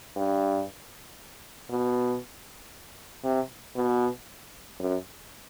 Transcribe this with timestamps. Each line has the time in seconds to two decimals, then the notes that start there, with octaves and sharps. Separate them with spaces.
0.16 G2
1.70 B2
3.24 C3
3.76 B2
4.80 F#2